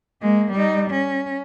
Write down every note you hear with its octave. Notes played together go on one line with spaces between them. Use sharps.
G#3 A#3
G3 D#4
C#4